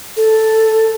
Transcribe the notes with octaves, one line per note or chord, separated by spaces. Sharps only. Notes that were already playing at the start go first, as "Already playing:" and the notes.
A4